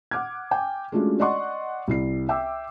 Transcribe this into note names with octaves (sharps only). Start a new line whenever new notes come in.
F#5 D6 F6 G#6
G5 G#5
G#3 A3 C#4 D4 F4 F#4
D5 D#5 F#5 C6 C#6
C2 E4 C7
E5 G5 D6 E6